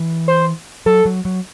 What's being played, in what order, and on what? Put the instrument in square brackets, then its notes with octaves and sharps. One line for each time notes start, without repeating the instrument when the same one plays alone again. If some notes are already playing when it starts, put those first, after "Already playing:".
Already playing: [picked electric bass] E3
[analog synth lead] C5
[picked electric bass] F#3 [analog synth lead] A4
[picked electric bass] F#3
F#3